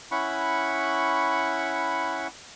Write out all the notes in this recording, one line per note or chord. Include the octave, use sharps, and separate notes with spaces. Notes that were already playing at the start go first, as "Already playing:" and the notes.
C#4 E4 F#5 B5 C#6